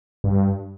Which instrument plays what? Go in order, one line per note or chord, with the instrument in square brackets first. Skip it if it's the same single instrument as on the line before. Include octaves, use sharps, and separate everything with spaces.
[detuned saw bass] G2